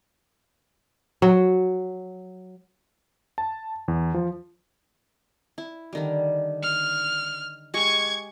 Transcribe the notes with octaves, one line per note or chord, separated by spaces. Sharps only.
F#3
A5
E2
F3
E4
D3 D#3 G3
F6
G#3 G4 G#5 C#6 G#6